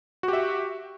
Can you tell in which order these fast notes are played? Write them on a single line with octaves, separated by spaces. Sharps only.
F#4 G4 E5